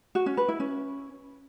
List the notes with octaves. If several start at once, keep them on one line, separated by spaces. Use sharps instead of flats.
F#4
C#4
B4
E4
C#4